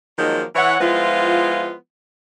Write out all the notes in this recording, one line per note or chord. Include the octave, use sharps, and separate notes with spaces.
D#3 F3 F#3 G#3 A#3 D#4
E3 C#5 F#5
F3 G#3 B3 E4 F4